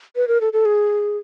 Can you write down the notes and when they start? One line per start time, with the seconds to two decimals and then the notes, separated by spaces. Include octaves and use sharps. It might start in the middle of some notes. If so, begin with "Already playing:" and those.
0.16 B4
0.28 A#4
0.41 A4
0.53 A4
0.65 G#4